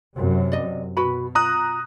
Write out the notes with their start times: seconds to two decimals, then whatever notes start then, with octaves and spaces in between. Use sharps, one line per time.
0.17 F#2 C3
0.52 D5 D#5
0.97 B2 F#4 B4 B5
1.35 F4 A#5 D#6 F#6